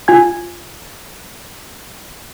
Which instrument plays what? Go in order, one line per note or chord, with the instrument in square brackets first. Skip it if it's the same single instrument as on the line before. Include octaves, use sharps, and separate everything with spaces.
[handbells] F4 G#5 G#6